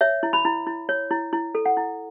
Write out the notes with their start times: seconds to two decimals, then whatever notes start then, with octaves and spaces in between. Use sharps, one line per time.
0.01 C#5 E5
0.23 E4
0.33 B5
0.45 E4
0.67 E4
0.89 C#5
1.11 E4
1.33 E4
1.55 A4
1.66 F#5
1.77 E4